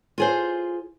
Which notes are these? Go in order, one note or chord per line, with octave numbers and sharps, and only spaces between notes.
F4 G#4 C5